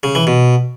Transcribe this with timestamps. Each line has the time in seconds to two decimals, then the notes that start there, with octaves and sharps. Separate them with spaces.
0.03 C#3
0.15 E3
0.27 B2